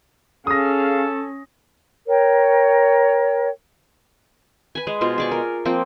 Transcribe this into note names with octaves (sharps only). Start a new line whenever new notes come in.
C#4 G#4 A4 F5 D#6 A#6
A#4 C#5 G5
B4 G#5
G#3 G#4
B2 F4 C5
G#4 D5 C#6
A#4
F3 A#3 C4 G5